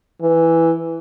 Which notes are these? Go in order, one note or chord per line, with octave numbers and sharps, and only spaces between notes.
E3